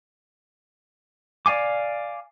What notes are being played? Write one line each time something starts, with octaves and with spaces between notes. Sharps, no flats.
D5 F5 G#5 D6